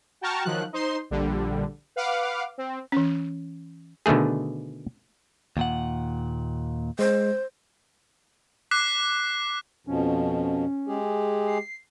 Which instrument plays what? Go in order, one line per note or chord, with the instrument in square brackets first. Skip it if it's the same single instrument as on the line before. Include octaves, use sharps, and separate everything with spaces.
[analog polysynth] F#4 G5 A5 A#5 C#6 F6
D#3 F3 F#3 F#6
D#4 C5 C6
A#1 D3 G3
B4 F5 F#5 D6
C4
[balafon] E3 C#4
[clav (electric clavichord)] B2 D3 D#3 A3 G#4
[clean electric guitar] D#2 A#2 F#5
[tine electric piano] G#3 [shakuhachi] C5
[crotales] D6 F#6 B6 C7
[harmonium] F2 B2 F3 [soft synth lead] C#4
[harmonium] G#3 G4 G#4
[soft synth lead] C7